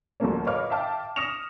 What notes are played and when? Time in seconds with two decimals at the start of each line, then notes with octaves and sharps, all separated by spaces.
0.20 D2 F3 G3 A3 A#3 C#4
0.46 B4 C#5 D#5 F5 D6 F6
0.70 E5 F5 G5 A5 D6 F6
1.16 D#6 F6 A#6 C#7 E7 F7